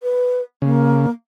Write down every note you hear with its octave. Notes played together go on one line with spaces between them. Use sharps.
B4
C#3 A#3